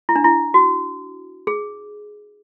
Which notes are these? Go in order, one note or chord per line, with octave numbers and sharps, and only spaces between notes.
E4
D4
E4
F#4
G#4